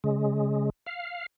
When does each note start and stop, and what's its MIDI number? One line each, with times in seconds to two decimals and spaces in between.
0.04 0.70 49
0.04 0.70 56
0.86 1.26 77